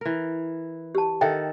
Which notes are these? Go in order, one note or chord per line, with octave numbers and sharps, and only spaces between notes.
E3 A#4
G4 A5
D#3 A4 E5 F#5 G5